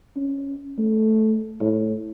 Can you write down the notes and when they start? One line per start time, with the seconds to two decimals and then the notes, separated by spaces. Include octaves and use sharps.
0.17 C#4
0.78 A3
1.61 A2